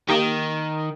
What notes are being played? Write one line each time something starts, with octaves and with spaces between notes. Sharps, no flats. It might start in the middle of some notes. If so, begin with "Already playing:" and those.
D#3 A#3 D#4 G4